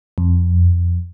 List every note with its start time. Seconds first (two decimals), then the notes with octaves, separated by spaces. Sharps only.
0.18 F2